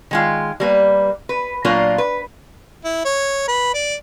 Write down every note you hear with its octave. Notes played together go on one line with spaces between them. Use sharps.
D#3 G#3 F4
G3 A#3 B4
B4
A#2 F#3 A#3 D4 F4 A#4
B4
E4
C#5
B4
D5